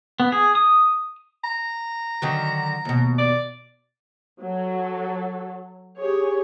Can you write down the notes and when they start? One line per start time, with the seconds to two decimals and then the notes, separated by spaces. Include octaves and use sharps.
0.20 B3
0.32 G#4
0.55 D#6
1.44 A#5
2.22 D3 D#3 F#3
2.85 D#2 B2
3.18 D5
4.42 F#3 A4
5.99 G4 G#4 C#5